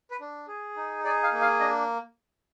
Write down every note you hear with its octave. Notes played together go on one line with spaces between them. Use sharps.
B4
D4
G#4
D#4
G#4 D5
F5
A#3
F5
D4 D#5